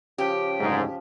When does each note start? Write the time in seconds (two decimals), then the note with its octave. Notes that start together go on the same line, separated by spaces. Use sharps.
0.18 C#3 F3 G4 G5
0.60 F#1 D2 G#2